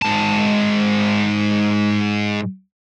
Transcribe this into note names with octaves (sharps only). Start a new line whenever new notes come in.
G#2 A5